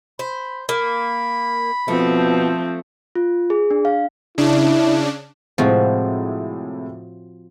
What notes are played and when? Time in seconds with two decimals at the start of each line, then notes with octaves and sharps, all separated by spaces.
0.19 C5 B5
0.69 A#3 B5
1.88 B2 F3 A3 C4
3.15 F4
3.50 G#4
3.71 D4
3.85 F5
4.38 C#3 D4 E4
5.58 A2 C3 F3 G#3 C4 F#4